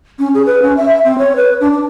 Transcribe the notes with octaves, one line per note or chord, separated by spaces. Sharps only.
C#4
G#4
B4
C#4
E5
E5
C4
C#5
B4
D4
D4